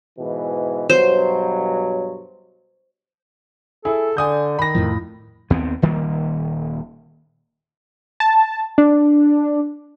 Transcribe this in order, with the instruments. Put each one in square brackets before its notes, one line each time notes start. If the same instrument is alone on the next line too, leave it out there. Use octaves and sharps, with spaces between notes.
[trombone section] G#2 B2 E3
[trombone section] G2 B2 F#3 [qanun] C5
[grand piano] E4 G#4 [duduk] A4
[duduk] D3 [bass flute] D5 [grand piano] G#5 D#6 G6
[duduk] D#3 [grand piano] B5 A#6
[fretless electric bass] F2 A2 F3 [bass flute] E4
[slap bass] D#2 B3 C4
D#1 D#3 G3 A#3
[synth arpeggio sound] A5
D4